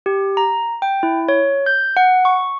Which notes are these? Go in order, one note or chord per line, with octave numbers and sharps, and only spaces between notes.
G4
A#5
G5
E4
C#5
G6
F#5
C#6